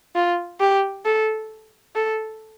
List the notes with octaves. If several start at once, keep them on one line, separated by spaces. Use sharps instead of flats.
F4
G4
A4
A4